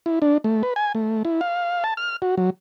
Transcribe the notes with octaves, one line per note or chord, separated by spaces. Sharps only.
E4
D4
A3
B4
G#5
A3
E4
F5
A5
F6
F#4
F#3